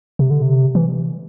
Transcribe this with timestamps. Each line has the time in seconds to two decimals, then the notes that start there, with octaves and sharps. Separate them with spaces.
0.19 C3
0.30 D3
0.42 C3
0.75 E3